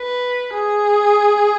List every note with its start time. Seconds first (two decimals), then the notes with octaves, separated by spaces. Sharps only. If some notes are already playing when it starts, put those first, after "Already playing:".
Already playing: B4
0.54 G#4